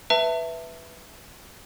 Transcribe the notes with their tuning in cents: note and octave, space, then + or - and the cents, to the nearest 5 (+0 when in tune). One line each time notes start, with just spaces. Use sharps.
B4 +0 E5 +0 A5 +35